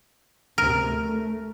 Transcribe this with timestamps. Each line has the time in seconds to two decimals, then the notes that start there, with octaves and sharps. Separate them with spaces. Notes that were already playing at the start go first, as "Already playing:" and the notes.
0.58 D2 C3 A#4
0.88 A3